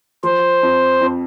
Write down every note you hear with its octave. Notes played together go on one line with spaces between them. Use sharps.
F3 C5
F2
F2